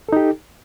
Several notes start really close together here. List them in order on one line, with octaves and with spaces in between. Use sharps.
A4 D#4 G4